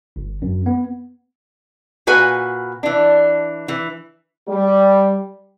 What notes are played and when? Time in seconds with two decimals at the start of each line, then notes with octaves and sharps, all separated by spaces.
0.16 G1
0.42 F#2
0.66 B3
2.07 A#2 F#4 B4 G#5
2.83 E3 D4
3.68 E3
4.48 G3